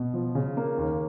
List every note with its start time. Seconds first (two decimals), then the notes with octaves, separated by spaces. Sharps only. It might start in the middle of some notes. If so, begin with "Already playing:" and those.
Already playing: B2
0.14 F3
0.35 C#3
0.57 A#3
0.78 D#2